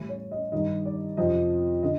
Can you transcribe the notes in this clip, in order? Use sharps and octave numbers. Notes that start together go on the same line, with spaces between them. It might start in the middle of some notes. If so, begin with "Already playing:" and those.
Already playing: A2 E3 G3
C#5
D#5
G2 D#3 G3 D#5
D5
F2 C3 F3 D#5
D3 D#5